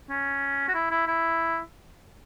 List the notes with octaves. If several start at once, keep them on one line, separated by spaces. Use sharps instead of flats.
C#4
F#4
E4
E4
E4